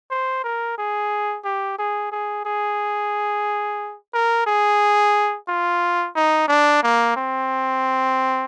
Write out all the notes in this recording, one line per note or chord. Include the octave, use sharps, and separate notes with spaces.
C5
A#4
G#4
G4
G#4
G#4
G#4
A#4
G#4
F4
D#4
D4
A#3
C4